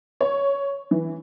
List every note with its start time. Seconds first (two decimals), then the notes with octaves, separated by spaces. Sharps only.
0.21 C#5
0.91 E3